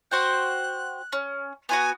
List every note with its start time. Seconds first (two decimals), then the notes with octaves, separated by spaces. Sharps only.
0.11 F#4 C5 G5 F#6
1.13 C#4
1.69 B3 F4 F#4 G#5